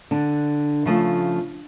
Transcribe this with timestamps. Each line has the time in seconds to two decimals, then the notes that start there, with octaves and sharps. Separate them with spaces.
0.11 D3 D4
0.85 C#3 F3 A3